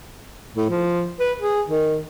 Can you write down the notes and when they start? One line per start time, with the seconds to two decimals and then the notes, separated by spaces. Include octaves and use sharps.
0.56 A2
0.70 F3
1.20 B4
1.40 G#4
1.69 D#3